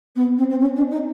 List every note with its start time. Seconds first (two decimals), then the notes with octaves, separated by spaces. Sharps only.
0.15 B3
0.37 C4
0.49 C4
0.60 C#4
0.76 D4
0.90 D#4